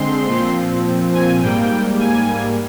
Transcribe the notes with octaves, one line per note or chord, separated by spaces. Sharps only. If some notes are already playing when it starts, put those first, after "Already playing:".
Already playing: D3 G#3 C4 C6
A#2 F3 C4
G#5
G#2 G3 A#3 G5
G#5